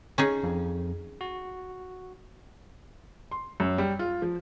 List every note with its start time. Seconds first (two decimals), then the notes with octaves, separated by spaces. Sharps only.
0.18 C#4 D#4 G#4
0.43 F2
1.21 F#4
3.31 C6
3.60 F#2
3.78 G3
3.99 F4
4.22 F3